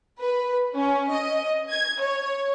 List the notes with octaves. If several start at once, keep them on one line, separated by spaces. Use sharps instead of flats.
B4
C#4
D#5
G#6
C#5